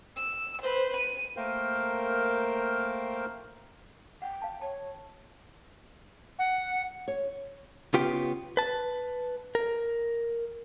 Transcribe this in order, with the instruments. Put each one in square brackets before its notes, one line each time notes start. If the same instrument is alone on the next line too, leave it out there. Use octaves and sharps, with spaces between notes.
[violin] E6
B4 C5
D#7
[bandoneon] A3 A#3 A#4 C5 F5 G5
[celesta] F#5 [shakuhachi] G5
[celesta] F5 A5
[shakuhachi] C#5 [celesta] A5
[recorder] F#5
[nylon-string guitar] C#5
[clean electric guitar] C#3 B3 F4 G4 G5
B4 A5
A#4